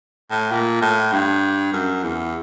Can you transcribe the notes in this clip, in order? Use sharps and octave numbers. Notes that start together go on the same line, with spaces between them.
A2
A#2
A2
G2
F#2
E2